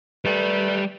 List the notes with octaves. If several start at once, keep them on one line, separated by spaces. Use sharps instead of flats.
D#3 G3 A3 B4 D5